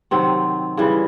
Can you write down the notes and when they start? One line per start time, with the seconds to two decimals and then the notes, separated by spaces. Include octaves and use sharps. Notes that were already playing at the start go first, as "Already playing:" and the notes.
0.11 C3 D#3 F#3 C4
0.77 C#3 E3 G3